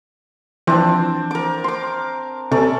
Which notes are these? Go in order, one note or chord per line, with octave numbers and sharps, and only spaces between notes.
E3 F3 C4 D4
A#4 D6
C6 D6
C3 C#4 A4 D5